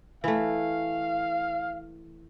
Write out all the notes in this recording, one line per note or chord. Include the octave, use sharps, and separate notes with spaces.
E3 A3 F5